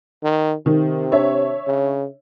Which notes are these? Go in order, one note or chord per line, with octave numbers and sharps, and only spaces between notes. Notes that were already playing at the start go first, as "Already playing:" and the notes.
D#3
C3 D#3
D4 C#5 E5
C#3